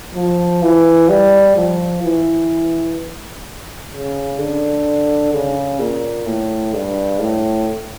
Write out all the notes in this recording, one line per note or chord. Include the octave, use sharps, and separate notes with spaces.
F3
E3
G3
F3
E3
C#3
D3
C#3
A#2
A2
G2
A2